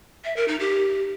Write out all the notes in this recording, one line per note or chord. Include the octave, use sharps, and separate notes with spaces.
E5
A#4
D#4
G4